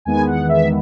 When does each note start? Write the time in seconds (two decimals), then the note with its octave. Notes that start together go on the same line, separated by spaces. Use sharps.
0.05 E2 D#3 G#3 B3 G#5
0.27 F#5
0.49 E5